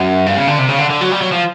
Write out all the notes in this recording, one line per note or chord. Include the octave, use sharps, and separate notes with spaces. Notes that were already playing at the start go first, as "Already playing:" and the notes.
Already playing: F#2
G2
C#3
D3
C3
C#3
D3
D3
F#3
G3
F#3
F3